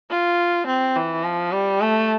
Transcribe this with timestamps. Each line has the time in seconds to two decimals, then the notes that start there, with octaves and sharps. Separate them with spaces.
0.10 F4
0.66 C4
0.96 E3
1.24 F3
1.52 G3
1.81 A3